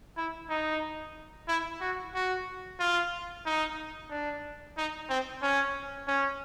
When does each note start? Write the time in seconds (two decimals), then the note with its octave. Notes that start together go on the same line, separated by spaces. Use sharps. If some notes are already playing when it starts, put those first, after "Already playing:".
0.17 E4
0.50 D#4
1.48 E4
1.81 F#4
2.15 F#4
2.80 F4
3.46 D#4
4.11 D4
4.77 D#4
5.09 C4
5.42 C#4
6.08 C#4